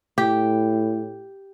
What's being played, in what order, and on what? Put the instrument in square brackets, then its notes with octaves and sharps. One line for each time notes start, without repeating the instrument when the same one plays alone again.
[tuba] A2 [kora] G4